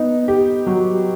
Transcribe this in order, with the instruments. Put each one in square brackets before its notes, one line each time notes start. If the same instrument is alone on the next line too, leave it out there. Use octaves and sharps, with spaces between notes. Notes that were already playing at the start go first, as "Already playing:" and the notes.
Already playing: [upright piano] B3 D#4
G4
F#3